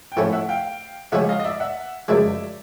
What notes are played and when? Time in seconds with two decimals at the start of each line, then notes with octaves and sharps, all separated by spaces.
0.12 G5
0.16 A2 F3 A3 C#4 E5 F#5
0.32 E5 F#5
0.49 F5 G5
1.12 C#3 F3 G#3 C#4 E5 F#5
1.29 D#5 F5
1.40 D#5
1.44 D5 E5
1.60 E5 F#5
2.08 F#2 C#3 F3 G#3 D5 E5